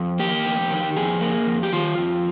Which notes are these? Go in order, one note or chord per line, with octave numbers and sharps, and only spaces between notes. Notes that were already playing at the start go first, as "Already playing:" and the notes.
Already playing: F2
A#3 G4
F2
D#3
F2 G#4
A#3
F2
G4
D#3 F4
F2